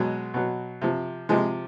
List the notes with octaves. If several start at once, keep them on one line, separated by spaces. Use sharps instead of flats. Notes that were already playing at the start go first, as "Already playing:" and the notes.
Already playing: B2 F#3 G#3
B2 F#3
C3 F3
C3 F3 G#3